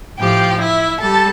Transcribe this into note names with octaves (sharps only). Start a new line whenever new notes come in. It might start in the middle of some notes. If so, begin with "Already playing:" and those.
A2 F3 G4 G5
E4 E5
G3 A4 A5